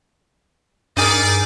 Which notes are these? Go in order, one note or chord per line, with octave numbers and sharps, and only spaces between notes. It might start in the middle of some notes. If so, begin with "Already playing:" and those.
G2 G3 D#4 G#4 A#4 D5